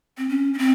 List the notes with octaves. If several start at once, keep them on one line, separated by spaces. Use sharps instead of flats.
C4
C#4
C#4
C4